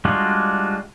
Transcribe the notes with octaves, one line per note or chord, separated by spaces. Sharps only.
G3 G#3 D4 F4 F#4